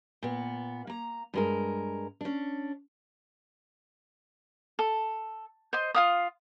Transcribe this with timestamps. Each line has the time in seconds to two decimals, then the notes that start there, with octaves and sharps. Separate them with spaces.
0.22 A#2 B3
0.87 A#3 A#5
1.34 G2 G#3 A#4
2.21 C#4 D4
4.79 A4
5.73 C5 D#5
5.94 F4 F5 D#6